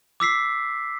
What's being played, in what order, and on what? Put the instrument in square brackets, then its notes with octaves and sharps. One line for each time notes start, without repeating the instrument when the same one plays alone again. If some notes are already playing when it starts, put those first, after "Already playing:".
[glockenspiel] D6 E6 B6 C7